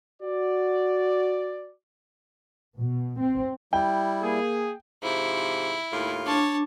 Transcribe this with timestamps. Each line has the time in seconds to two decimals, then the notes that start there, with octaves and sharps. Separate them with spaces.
0.22 F#4 D5
2.78 B2
3.20 C4
3.73 G3 E4 G5
4.22 A#3 G#4
5.03 G#2 C3 F3 E4
5.92 D#2 A2 F4
6.26 D4 C#5 A5 D6